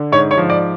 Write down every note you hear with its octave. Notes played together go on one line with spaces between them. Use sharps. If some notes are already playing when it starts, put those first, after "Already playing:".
Already playing: D3
G#2 C#5 C#6
C#5 C#6
F3
D5 D6